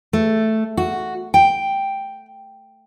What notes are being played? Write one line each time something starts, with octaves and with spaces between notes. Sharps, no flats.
A3
F#4
G5